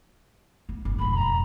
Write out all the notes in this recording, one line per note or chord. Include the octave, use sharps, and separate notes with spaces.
B3
G1
E1 F2 B5
A#5